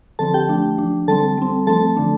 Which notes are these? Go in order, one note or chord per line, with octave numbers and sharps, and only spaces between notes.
D3 F3 C4 A4 A5
G4 G5
F3 A3 D4
F3 D4
D3 G3 C4 A4 A5
G3 C4
F3 A3 C4 A4 A5
D3 F3 A3 D4